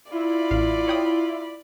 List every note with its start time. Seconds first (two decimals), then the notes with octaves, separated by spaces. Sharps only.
0.12 E4 F4 D5 B5
0.51 A1 F5
0.88 C#5 G5 D#6